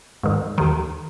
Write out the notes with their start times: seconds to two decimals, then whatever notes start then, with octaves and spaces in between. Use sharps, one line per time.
0.23 G#2 D#3
0.58 D#2 D#3